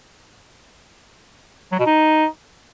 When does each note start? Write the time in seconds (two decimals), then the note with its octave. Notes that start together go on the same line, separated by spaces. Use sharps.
1.72 F#3
1.79 B2
1.86 D#4